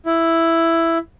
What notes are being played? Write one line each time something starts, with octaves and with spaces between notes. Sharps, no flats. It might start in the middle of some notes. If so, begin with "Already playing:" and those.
E4